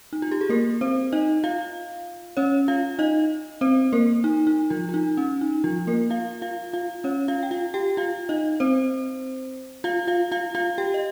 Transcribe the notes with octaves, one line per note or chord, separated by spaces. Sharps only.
D#4
F4
G4
G#4
A#3 A#4
C4 C5
D#4 D#5
F4 F5
C#4 C#5
F4 F5
D#4 D#5
C4 C5
A#3 A#4
D#4
D#4
F3 F4
F4
D#4
C#4
D#4
F3 F4
A#3 A#4
F4 F5
F4 F5
F4 F5
C#4 C#5
F4 F5
G5
F4 F5
G4 G5
F4 F5
D#4 D#5
C4 C5
F4 F5
F4 F5
F4 F5
F4 F5
G4 G5
D#5